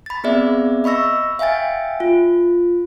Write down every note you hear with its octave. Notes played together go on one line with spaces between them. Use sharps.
B5 A6
B3 C4 G#4 D5 E5
D#5 B5 C#6 E6 A#6
E5 F5 G5 G#5 A6
F4